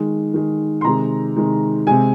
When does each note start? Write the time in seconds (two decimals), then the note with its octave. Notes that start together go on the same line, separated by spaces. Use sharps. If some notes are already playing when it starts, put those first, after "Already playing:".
Already playing: D#3 G#3
0.34 D#3 G#3
0.81 C6
0.85 C3 D#3 G#3 A#5
1.37 C3 D#3 G#3
1.87 C3 G#3 G#5